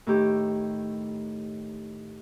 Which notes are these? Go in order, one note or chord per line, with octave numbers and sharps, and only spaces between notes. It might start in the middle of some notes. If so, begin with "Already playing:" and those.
A2 D#3 G4